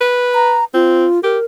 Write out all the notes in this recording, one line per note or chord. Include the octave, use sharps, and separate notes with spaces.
B4
A#5
C4 F4
G4 A#4